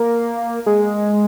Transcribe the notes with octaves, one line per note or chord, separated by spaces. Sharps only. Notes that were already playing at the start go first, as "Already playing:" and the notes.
Already playing: A#3
G#3